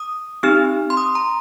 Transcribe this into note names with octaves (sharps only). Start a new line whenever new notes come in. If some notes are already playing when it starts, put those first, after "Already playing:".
Already playing: D#6
C4 D#4 G4 F6
C6
D#6
A#5